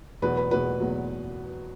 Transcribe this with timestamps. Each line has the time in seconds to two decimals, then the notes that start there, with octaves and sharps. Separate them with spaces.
0.22 E2 B2 F#3 B4
0.37 B4
0.51 E2 B2 F#3 B4
0.80 E2 B2 F#3